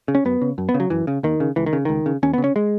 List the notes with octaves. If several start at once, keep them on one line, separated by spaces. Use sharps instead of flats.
C#3
C#4
F#2 B3
C#3
F#2
B3
C#3
F#3
F#2 E3
C#3
D#2 D#3
C#3
C#2 E3
D#3
C#3
C#2 D#3
C#3
D#2 C#4
B3
C#3
C#4
G#3